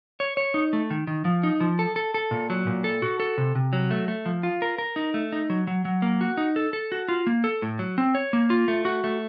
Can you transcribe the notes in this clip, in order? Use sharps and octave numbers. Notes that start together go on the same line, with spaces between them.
C#5
C#5
D#4
A3
D#3
D#3
F3
D#4
F3
A4
A4
A4
A#2
F#3
A#2
A4
F#4
A4
C3
C3
F#3
A3
A3
F3
F4
A#4
A#4
D#4
A3
D#4
F#3
F#3
F#3
A#3
F#4
D#4
A4
A4
F#4
F4
A#3
A4
A2
F#3
C4
C#5
A#3
F4
A3
F#4
A3